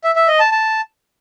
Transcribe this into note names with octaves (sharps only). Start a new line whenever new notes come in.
E5
E5
D#5
A5
A5